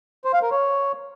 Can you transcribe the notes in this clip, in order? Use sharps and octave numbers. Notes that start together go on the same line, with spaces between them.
C5
F5
A#4
C#5